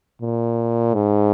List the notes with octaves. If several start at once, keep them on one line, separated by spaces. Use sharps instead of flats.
A#2
G#2